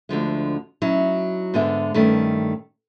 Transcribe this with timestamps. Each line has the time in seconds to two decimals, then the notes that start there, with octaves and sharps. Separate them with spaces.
0.09 D2 D3 F3 G#3
0.82 F#3 C#4 D#4 E4
1.54 G#2 D3 G#3 B3 E5
1.94 G2 D#3 A3 C#4